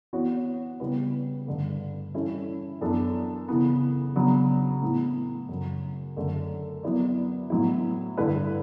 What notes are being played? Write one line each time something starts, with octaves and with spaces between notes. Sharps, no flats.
E3 B3 F#4 C#5
C#3 G3 B3 E4 B4
G2 D3 A3
E3 G3 C#4 E4 A4
F#2 E3 B3 D4 A4
C#3 E3 B3
C#3 F#3 B3 D4
A2 E3 B3
F#2 C#3 F#3
F#2 D3 A3
F#3 B3 E4 B4 D5
A2 F#3 B3 E4
G2 D3 A3 E4 B4